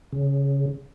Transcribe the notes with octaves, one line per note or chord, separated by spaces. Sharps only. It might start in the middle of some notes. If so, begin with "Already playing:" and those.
C#3